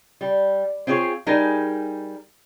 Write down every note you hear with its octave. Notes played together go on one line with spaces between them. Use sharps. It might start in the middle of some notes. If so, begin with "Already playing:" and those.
G3
C4 F4 G#4 A#4 C#5
G3 D#4 G#4 A#4 G#5 A5